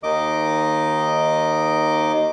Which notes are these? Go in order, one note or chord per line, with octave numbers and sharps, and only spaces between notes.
D#2 D#3 D#5 D6